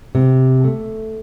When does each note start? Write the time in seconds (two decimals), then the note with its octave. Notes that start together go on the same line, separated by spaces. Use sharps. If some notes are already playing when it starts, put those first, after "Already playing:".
0.15 C3
0.64 A3